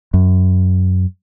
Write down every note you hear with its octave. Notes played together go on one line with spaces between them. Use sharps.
F#2